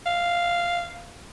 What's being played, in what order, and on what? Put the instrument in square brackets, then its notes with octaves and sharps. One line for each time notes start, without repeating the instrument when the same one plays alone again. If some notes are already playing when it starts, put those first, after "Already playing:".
[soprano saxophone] F5